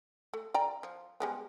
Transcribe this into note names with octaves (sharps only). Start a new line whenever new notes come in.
A3
D5 G5 A#5
F3
G3 G#3 B3